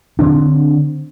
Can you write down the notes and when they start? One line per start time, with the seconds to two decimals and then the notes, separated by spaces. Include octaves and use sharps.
0.19 D3 C4 D4